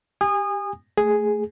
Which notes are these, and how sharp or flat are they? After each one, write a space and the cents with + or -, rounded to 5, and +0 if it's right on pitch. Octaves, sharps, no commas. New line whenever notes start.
G4 +0 G#5 -30 D#6 -25
A3 +0 G#4 +0